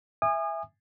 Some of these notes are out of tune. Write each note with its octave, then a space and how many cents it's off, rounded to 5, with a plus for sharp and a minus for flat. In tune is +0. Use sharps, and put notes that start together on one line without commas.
E5 +0 G#5 -20 D#6 -35